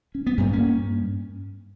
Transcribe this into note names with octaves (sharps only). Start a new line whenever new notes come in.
C#4
B3
G2 G3 A#3
A#3 C#4